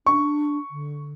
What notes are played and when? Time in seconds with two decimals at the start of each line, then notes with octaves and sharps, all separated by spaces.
0.06 D4 C#6
0.71 D3